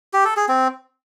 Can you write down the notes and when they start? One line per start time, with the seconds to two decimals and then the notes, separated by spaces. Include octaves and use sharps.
0.13 G4
0.25 A4
0.37 G#4
0.48 C4